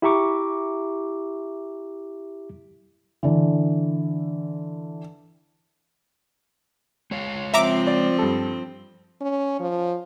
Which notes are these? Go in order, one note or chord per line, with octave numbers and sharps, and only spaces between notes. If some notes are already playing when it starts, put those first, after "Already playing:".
E4 G4 E5 A#5 C#6 D6
D3 E3
G#3 C#5 F5
F3 C4 E5 A#5 D6
D5
G2 A4
C#4
F3